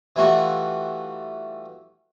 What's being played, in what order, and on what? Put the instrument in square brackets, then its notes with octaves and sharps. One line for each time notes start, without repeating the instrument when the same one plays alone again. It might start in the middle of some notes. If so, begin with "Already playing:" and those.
[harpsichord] E3 G3 A3 F4 F#4